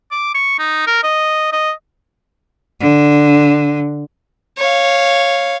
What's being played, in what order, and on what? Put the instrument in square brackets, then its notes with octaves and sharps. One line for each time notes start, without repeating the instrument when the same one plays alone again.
[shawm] D6
C#6
D#4
A#4
D#5
D#5
[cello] D3
[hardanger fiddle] C#5 F5